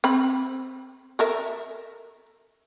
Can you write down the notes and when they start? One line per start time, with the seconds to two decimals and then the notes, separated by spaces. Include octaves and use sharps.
0.04 C4 B5
1.19 A4 A#4 E5